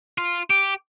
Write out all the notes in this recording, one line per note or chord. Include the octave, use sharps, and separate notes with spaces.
F4
G4